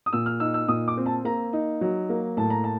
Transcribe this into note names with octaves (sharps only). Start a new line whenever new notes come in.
D#6
A#2 E6
F6
D#4 E6
E6
A#2 D#6
D6
C4
A5
A#3 A#5
D#4
F#3
A#3
A2 A5
A#5
A5